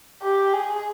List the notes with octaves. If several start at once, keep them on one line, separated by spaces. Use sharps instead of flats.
G4
G#4